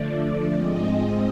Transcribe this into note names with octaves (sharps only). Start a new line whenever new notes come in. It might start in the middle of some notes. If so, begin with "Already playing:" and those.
Already playing: D3 F3 A3 D5
G#2 F3 G#3 C4 D#5